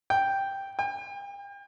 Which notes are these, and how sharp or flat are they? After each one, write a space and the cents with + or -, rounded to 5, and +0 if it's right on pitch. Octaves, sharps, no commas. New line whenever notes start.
G5 +0
G5 +40